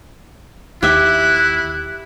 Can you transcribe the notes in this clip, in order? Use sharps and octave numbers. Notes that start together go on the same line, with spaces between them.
D#2 E4 G4 E5 F#6